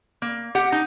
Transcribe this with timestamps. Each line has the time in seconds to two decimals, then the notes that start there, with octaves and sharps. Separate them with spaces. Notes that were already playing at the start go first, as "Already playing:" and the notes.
0.22 A#3
0.55 G4 F#5
0.72 D#4